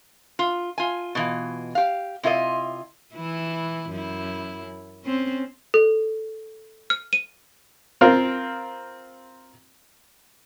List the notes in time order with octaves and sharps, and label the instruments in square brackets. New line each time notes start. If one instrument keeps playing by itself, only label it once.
[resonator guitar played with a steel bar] F4
F4 G#5
B2 E3 F4
G4 F5
C3 E4 F4 C5 D#5
[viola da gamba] E3 E4
F#2 E4
C4 C#4
[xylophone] A4
F6
D#7
[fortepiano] C4 F4 A#4 F5